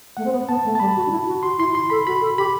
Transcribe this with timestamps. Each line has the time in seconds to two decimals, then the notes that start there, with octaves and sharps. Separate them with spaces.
0.17 A3 F#5
0.25 C4
0.33 B3
0.49 B3 A5
0.65 A3
0.75 A5
0.80 G3 B5
0.96 F#4
1.06 D4
1.11 E4
1.27 F#4
1.43 F#4 C6
1.59 E4 C6
1.75 E4 C6
1.90 A4 B5
2.07 F#4 B5
2.22 A4
2.38 G4 B5